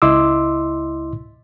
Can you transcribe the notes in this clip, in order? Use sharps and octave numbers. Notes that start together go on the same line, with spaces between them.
C#2 E4 D#5 C6 D6 E6